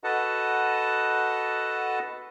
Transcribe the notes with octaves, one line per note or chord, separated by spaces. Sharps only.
F#4 A4 B4 D#5 F#5 A5